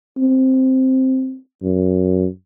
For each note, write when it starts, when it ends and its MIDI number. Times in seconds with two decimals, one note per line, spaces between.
0.18 1.37 60
1.62 2.26 42